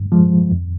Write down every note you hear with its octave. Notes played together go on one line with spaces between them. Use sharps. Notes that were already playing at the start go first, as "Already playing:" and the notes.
Already playing: G2
F3 G#3
F2